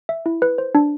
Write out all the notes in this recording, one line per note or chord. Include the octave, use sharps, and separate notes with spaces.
E5
E4
B4
C5
D4